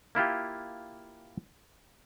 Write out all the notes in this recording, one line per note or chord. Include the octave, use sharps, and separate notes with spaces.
A#3 E4 F4 G4